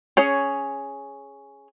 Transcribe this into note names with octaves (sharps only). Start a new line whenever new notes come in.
C#4 G#4 C#5